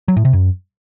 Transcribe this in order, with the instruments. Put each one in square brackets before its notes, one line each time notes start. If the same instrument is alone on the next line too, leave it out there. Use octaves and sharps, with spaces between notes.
[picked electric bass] F#3
A2
C3
F#2